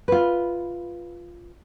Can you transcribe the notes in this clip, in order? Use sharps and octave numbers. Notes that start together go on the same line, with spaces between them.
F4 B4